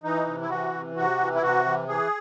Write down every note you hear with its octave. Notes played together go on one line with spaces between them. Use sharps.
E3 D#4
C3
E4
E3 F#4
C3
C3 F#4
E3
E4
C3 F#4
E3
E3 G#4